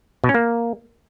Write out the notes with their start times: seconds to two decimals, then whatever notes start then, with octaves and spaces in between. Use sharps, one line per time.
0.24 B2
0.29 C#4
0.34 A#3